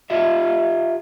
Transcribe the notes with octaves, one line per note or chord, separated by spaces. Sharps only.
F4 G4 E5